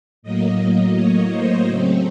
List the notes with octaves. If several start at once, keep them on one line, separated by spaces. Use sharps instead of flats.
A2 F#3 A#3 D#5
D#5
C#5
C5
C#3 F#3 A3 C4